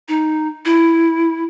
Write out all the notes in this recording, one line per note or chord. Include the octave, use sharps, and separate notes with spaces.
D#4
E4